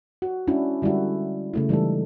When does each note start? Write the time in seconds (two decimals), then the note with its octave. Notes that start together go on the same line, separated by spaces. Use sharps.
0.22 F#4
0.47 G#3 C#4 D4 E4 F#4
0.82 D3 G3 G#3 E4 F#4
1.54 C#3 A3 E4
1.69 E3 G3 G#3 D#4 A4